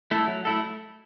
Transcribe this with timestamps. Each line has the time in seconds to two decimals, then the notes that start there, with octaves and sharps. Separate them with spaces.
0.11 A3 E4 A4
0.27 F#3
0.45 A3 E4 A4